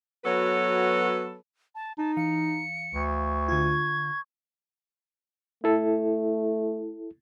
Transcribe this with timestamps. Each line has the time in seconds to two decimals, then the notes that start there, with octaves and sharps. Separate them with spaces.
0.24 F#3 B3 F#4 A4 B4 C#5
1.75 A5
1.98 D#4 A5
2.17 E3 F5 C#7
2.94 D2 C#6
3.48 D3 F4 G#6
5.64 A3 E4 A4